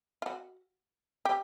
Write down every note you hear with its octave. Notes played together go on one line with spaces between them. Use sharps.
F4
F#4
G4